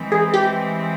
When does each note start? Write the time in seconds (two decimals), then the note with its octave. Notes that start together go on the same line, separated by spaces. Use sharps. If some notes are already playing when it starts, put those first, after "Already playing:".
Already playing: E3 G#3 C4
0.12 G#4
0.33 G4